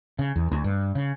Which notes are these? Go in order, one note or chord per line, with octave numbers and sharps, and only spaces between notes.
C#3
E2
D2
G2
C#3